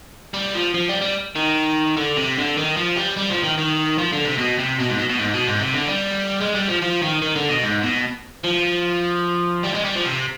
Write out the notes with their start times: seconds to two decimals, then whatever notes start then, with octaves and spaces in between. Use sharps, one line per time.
0.34 G3
0.54 F3
0.74 F3
0.89 G3
1.01 G3
1.36 D#3
1.97 D3
2.17 C3
2.37 D3
2.57 D#3
2.77 F3
2.97 G3
3.18 G3
3.31 F3
3.44 D#3
3.58 D#3
3.98 F3
4.12 D3
4.25 C3
4.38 B2
4.59 C3
4.80 B2
4.89 G#2
4.99 B2
5.09 B2
5.19 G#2
5.34 B2
5.47 G#2
5.60 C3
5.73 D3
5.87 G3
6.41 G#3
6.55 G3
6.68 F3
6.82 F3
7.02 D#3
7.22 D#3
7.36 D3
7.49 B2
7.63 G#2
7.83 B2
8.44 F3
9.64 G3
9.75 G#3
9.85 G3
9.96 F3
10.05 C3